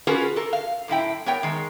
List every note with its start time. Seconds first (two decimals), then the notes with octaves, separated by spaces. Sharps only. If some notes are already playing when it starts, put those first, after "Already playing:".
0.07 C#4 F4 F#4 G#4 A#4 B4
0.36 A4 A#4
0.53 F5
0.88 F#2 A2 E4 G5
1.26 B3 A#4 C#5 G5
1.43 D#3 G#3